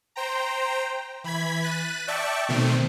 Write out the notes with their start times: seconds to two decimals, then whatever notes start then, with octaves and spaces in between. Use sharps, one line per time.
0.16 C5 G5 A#5
1.24 E3 B5 G#6 B6
1.62 F#6 A6 B6 D#7
2.08 D5 E5 G5 A5 C#6
2.49 B2 D#3 A3 C4